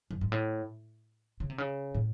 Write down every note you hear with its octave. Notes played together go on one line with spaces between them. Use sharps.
F#2
G#2
A2
C#3
C3
C#3
A2